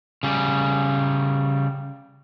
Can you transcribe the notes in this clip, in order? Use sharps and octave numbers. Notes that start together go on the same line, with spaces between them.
C#3 G3